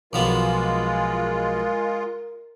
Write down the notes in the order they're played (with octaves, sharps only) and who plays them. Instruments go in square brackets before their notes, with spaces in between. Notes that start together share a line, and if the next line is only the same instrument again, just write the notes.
[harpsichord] B1 F3 B3 [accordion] G#3 F4 [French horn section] A#4